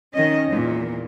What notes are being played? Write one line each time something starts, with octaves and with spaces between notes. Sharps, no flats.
D#3 C#4 D#5
E2 A#2